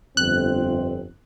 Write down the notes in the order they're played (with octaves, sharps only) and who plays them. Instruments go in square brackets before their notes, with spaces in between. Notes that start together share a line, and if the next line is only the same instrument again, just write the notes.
[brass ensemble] G1 F2 C4 [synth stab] F#6